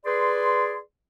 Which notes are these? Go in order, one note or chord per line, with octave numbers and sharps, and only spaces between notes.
G#4 B4 D5 C6